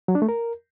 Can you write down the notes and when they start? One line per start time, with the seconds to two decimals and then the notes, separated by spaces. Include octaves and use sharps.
0.08 F#3
0.15 D4
0.22 A3
0.29 A#4